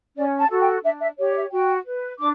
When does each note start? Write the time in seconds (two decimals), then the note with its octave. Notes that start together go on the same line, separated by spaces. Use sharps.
0.16 C#4 D5
0.39 A5
0.50 F#4 A4
0.62 G5
0.84 D4 E5
1.01 E5
1.18 G4 C#5
1.31 D5
1.35 E5
1.52 F#4 G5
1.86 B4
2.19 D4 D6